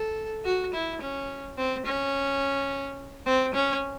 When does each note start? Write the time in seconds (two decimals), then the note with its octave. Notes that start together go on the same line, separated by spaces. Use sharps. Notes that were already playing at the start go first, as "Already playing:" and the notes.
Already playing: A4
0.45 F#4
0.74 E4
1.01 C#4
1.57 C4
1.86 C#4
3.26 C4
3.54 C#4